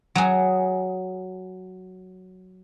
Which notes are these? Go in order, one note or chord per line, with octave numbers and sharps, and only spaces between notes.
F#3 G#4